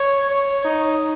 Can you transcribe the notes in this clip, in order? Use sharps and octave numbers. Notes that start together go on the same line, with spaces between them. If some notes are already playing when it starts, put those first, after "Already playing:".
Already playing: C#5
C#5
D#4